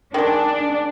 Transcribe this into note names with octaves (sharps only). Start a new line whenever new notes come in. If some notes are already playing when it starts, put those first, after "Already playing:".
D#3 G#3 D4